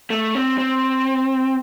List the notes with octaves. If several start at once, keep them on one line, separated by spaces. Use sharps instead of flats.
A3
C4
C4